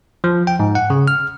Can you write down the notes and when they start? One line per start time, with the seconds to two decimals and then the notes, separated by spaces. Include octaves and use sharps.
0.24 F3
0.47 G5
0.60 G#2
0.75 F#5
0.90 C#3
1.08 F6